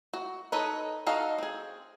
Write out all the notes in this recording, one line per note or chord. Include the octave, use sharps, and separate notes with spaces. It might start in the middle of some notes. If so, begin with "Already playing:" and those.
F#4
D#4 A4 B4 C#5 D#5
D#4 F#4 A4 D#5 F5
C4 G#4